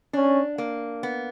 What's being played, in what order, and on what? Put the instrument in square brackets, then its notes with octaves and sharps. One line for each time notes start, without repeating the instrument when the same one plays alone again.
[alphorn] C#4 [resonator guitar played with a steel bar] D4
[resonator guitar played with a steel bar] A#3
B3